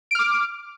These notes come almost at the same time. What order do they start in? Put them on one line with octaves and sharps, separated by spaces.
D7 F6 D6